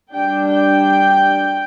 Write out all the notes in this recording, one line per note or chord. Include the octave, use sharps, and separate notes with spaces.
G3 D4 G5
G5